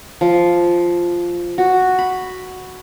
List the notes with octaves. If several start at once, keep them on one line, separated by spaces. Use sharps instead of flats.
F3
F#4
B5